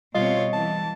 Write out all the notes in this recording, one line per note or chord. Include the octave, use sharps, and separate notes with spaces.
B2 G3 C4 F4 C#5 D#5
E3 A5